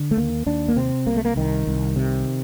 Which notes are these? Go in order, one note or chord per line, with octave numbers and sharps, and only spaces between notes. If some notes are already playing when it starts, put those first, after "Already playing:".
Already playing: D3
A3
D#2 A#3
D#2 D4
A#3
C3 C4
C2 A#3
A3
A#3
C2 D#3
C2
C3